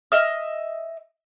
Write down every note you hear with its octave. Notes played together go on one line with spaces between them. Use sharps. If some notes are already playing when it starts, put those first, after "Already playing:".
D#5 E5 F6